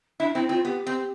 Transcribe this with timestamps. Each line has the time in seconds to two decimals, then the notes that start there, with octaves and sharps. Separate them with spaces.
0.20 D4 E4
0.35 C4 E4
0.49 C4 F4
0.65 B3 G4
0.87 C4